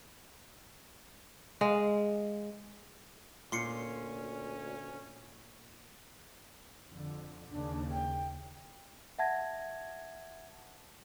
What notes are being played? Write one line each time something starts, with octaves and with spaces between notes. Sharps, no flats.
G#3 F5
D2 A#2 C#4 C6 C7 C#7
F2 D3
D#2 C#3 D4
G5
E5 F#5 A5 G#6 A#6